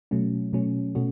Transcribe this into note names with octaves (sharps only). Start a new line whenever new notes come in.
B2 F#3 A3 C#4
B2 F#3 A3 C#4
B2 A3 C#4 F#4